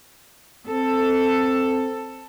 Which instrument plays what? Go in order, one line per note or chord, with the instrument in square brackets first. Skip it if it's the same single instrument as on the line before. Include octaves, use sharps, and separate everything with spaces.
[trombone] C4 [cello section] A4